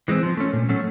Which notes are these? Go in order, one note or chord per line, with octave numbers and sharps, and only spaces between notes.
E3 G#3 C4
F3
A3 C#4
A#2
F#3 A3 C#4